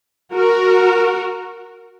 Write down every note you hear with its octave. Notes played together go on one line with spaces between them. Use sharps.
F#4 A#4